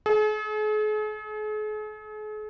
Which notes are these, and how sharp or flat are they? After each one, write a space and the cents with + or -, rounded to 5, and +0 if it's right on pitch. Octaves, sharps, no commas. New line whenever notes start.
G#4 +45